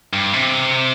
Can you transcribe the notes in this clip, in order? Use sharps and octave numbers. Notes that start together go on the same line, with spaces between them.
G2
C3